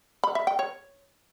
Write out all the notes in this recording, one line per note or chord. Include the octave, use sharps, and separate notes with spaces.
B5
E5
G5
C#5